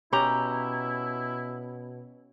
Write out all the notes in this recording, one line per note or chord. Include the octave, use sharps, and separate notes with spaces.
B2 C#4 E4 G4 A#5